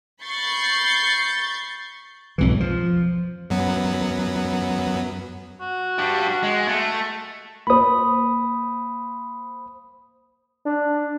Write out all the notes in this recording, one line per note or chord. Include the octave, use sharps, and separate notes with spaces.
B5 C#6 G6 A6 C7
B1 F2 G#2 E3
F3
F#2 F#3 B3
F#4
G3 D4
G#3
A3
A#3 C5 B5 D#6
D4